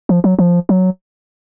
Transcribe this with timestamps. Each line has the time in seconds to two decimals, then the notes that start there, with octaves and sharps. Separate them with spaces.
0.09 F3
0.24 F#3
0.39 F3
0.69 F#3